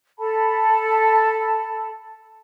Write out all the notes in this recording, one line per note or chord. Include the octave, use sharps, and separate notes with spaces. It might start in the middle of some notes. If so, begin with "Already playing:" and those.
A4 A5 B5